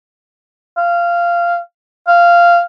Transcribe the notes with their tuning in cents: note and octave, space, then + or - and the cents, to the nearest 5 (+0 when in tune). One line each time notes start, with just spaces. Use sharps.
F5 -15
F5 -10